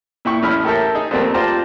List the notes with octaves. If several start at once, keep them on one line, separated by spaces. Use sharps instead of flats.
A#2 E4 G5 C#6
A1 A2 C#4 E4 B5 F6
G4 A4 A#4 E5 G5 A5
D#4 G#4
F2 G3 A3 A#3 C4 A5
F4 G4 C5 D5 A5 A#5